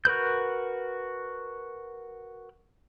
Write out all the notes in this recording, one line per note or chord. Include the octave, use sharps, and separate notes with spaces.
F#4 A#4 B4 G6